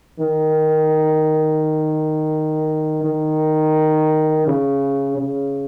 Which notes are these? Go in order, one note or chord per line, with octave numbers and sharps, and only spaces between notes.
D#3
D#3
C#3
C#3